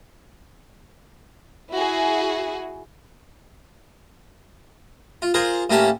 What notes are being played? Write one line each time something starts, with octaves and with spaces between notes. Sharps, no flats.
E4 F#4 G#4
F4
F4 G#4 A#4 C5
A2 A#3 C#4 G4 F5 A5